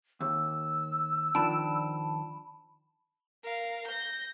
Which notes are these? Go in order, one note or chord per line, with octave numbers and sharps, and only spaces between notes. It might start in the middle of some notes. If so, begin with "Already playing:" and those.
D#2 E6
D#3 F3 D4 A5 B5
A#4 F5
G6 A#6